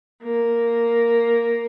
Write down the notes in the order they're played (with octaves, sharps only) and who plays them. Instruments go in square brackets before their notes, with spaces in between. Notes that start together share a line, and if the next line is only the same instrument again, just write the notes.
[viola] A#3